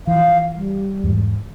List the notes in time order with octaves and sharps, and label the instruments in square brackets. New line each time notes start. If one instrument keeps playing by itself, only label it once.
[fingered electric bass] E3 F3 [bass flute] F5
[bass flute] G3
[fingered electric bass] E2 G#2